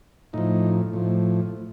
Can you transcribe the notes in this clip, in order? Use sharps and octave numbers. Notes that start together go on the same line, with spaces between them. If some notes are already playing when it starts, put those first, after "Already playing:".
A2 F3 D#4
A2 F3